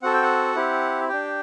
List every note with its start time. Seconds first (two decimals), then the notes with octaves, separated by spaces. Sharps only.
0.02 C4 F#4 A4 F#5
0.13 G5
0.23 F#5
0.56 C4 E4 G4
1.08 D4 G4 G5